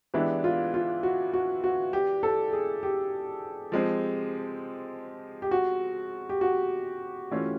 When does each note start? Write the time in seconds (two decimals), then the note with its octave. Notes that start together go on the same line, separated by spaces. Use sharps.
0.14 E3 G#3 B3 D4 E4 G4
0.44 F4
0.74 F4
1.03 F#4
1.34 F#4
1.64 F#4
1.93 G4
2.23 A4
2.53 G#4
2.83 G4
3.72 F3 G#3 C4
5.42 G4
5.51 F#4
6.29 G4
6.41 F#4
7.31 E3 A3 C#4 F4